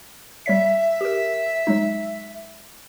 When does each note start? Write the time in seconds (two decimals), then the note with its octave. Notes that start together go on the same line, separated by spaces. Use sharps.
0.46 G3 C#5 E5 B6
1.01 G4 A#4
1.67 F#3 G#3 D#4